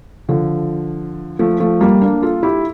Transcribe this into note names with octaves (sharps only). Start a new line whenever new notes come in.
D3 F3
F3 A3
F3 A3
G3 A#3
A#3 D4
F4 A4
E4 G4